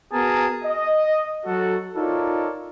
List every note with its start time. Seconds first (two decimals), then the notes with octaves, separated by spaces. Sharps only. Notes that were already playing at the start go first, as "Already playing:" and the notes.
0.13 B3 F#4 G#4 A#4 A5 A#5
0.64 D#5
1.46 F#3 F#4 A4
1.96 D#4 F4 A4 A#4 C#5 D5